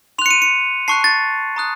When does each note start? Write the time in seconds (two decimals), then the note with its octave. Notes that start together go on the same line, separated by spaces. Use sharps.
0.18 C6 F7
0.22 F#6 C#7
0.31 D#7
0.42 C#7
0.88 A5 C#6 F#6 C7
1.04 A6
1.56 A#5 D#6 F#6